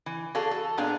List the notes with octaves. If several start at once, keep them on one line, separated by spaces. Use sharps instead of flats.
E3
F#4 G#4 A4 D5 F5
A4
A#2 B3 D4 G#4 F5